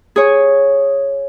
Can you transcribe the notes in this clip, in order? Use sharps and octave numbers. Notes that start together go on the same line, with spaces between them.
G#4 C#5